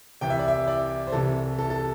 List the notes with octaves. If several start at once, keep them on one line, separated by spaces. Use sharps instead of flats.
C2 C3 E3 G5
E5
D5
E5
D5
C5
C2 C3 E3 A4
A4
A4